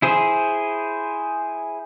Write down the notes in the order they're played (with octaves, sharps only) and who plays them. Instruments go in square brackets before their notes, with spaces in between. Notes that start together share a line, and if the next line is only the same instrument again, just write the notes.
[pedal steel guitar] E4 G#4 C5